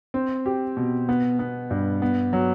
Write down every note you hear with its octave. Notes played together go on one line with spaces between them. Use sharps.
C4
G4
B2
B3
B3
G2
B3
F#3